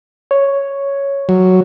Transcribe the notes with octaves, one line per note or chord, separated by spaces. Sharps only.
C#5
F#3